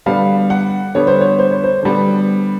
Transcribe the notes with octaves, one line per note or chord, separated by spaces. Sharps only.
D3 G3 B3 F5
F#5
D3 G3 B3 C#5
C5
C#5
C5
C#5
C5
D3 G3 B3